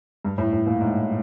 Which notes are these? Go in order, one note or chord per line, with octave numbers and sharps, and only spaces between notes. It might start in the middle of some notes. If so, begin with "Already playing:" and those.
G2
A2
A2
A#2
G#2